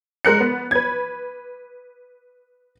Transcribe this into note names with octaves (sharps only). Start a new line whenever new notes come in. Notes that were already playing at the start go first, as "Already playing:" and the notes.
G#3 A#4 F#6 C#7
B3
B4 G#6